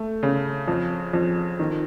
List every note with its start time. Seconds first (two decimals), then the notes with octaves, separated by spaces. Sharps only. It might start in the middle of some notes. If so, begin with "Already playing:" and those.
Already playing: A3
0.23 C#3
0.68 F2
1.13 F2
1.59 D#3